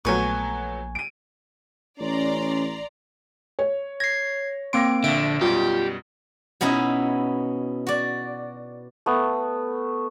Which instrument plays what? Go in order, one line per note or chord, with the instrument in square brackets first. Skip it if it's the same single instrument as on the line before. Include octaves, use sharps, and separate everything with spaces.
[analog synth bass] A#1 [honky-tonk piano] F#3 A3 B3 [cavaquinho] G#5 C#6
[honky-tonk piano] D7 D#7
[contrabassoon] A1 [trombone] C#4 [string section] D5 A#5 C6
[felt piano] C#5
[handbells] G#6 C7 [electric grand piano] A#6
[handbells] A#3 C4 D7 [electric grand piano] C6 D6 A#6
[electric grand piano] A#1 E5 [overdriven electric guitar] D3 [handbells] D7
[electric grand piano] F#2 B2 G3 [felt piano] F4 [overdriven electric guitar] G4
[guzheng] B2 B3 C#4 D#4 E4
F#4 D5
[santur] A3 B3